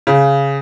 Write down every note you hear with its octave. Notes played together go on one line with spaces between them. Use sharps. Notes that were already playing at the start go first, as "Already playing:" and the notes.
C#3